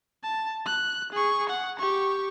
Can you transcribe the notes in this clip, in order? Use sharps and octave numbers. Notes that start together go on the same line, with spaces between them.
A5
F#6
G#4 C#6
F#5
G4 C#6